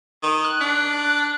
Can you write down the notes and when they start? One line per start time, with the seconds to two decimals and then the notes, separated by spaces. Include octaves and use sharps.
0.22 D#3
0.44 F#6
0.61 D4